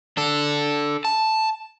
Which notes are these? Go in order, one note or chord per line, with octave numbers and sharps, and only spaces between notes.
D4 A4
A5